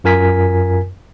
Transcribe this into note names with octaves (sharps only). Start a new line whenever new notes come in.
F#2 F4 A#4 G#5 B6